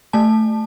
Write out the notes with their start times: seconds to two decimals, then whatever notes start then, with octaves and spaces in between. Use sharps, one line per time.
0.13 A3 A5